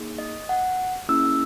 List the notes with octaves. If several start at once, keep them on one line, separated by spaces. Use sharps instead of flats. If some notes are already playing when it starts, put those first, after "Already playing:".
Already playing: A#3 D#4 G#4
D#5
F#5
A#3 C#4 E4 G#4 E6